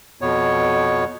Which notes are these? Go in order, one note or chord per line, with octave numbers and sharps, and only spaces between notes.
F2 B2 B3 C#5